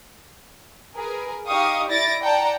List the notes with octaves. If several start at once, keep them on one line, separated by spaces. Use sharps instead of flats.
G#4 A#4 B4
D#4 G4 F5 G5 C#6 D#6
E4 D5 A6 A#6 D7
D5 F#5 G5 A5 A#5